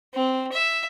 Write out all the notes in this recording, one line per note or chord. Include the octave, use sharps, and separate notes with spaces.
C4
E5